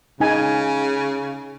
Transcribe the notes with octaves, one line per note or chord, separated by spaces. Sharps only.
C#3 D#4 G#5